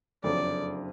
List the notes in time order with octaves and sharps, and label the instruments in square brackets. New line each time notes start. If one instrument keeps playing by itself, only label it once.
[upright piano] F#1 F2 D3 F#3 [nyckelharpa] D5